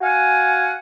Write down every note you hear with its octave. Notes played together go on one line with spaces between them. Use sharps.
F#4 F5 F#5 G#5